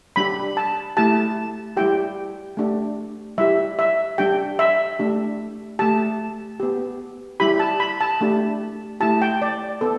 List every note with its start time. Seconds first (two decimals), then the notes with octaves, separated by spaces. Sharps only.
0.16 G3 D4 G4 B5
0.57 A5
0.97 A3 E4 G4 A5
1.77 G3 E4 G4 G5
2.57 A3 D4 G4
3.38 G3 E4 G4 E5
3.79 E5
4.18 G3 D4 G4 G5
4.59 E5
4.99 A3 D4 G4
5.79 A3 G4 A5
6.60 B3 G4
7.40 G3 E4 G4 B5
7.59 A5
7.80 B5
8.01 A5
8.21 A3 D4 G4
9.00 A3 E4 G4 A5
9.22 G5
9.42 D5
9.81 B3 A4